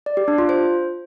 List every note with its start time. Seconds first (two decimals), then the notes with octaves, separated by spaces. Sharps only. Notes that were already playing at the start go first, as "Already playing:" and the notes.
0.06 D5
0.17 G4
0.28 D4
0.38 F4
0.49 C5